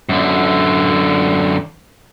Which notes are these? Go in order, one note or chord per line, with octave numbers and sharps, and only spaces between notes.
F#2 D3